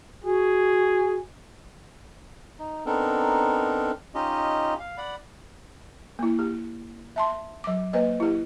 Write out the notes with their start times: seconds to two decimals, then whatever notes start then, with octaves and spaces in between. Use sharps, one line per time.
0.24 F#4 G#4
2.59 D#4
2.86 B3 C4 D4 D#4 A4 A#4
4.15 C#4 D#4 F4 G4 D#5
4.79 F5
4.98 D5 F#5 B5
6.19 A#3 E4
6.39 G4
7.16 E5 A5 C6
7.64 F#3 D6
7.93 A#3 B4 C5 D#5
8.20 E4 G4